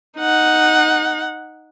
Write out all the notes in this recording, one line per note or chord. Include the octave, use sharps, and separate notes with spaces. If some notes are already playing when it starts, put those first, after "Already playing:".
D#4 F#5